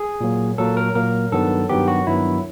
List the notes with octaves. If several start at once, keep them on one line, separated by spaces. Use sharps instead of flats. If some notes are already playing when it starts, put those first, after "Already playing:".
Already playing: G#4
A#2 F#3 A#3
A#2 F#3 A#3 A4
A#4
A#2 F#3 A#3 A#4
G2 D#3 F#3 B3 A4
G2 D#3 F#3 B3 G4
F#4
G2 D#3 F#3 B3 E4